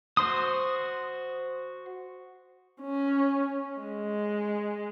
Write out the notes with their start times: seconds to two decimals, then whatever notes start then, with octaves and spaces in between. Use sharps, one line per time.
0.17 F#4 C5 C6 D#6
2.82 C#4
3.80 G#3